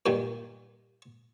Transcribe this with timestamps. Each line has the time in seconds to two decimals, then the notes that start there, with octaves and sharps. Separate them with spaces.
0.06 G2 A#2 D#3